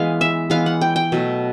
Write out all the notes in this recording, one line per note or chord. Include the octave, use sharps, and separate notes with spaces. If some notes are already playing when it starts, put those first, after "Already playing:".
Already playing: E3 G#3 B3 F5
E5
E3 G#3 B3 F5
F#5
G5
G5
B2 F#3 A3